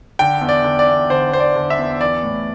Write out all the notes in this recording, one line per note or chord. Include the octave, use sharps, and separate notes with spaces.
D3 G5
E2
D5
D3
D5
E2
D3 C5
E2 C5
D5
D3
E5
E2
E3 D5
A2